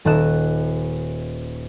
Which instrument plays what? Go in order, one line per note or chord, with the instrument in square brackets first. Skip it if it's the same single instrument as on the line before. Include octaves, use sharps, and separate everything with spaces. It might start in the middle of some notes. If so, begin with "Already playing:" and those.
[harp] D#1 A4 D#5 F#6 E7